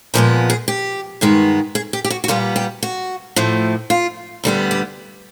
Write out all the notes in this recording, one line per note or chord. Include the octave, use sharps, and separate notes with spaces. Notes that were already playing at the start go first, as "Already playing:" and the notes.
A#2 F3 G#3 B3 D#5
G#4
G4
G2 D#3 G#3 B3
G#4
G4
G4
F#4
F#4
A#2 G3 B3 F4
G4
F#4
A2 F3 A3
F4
D2 D3 G3 B3
G4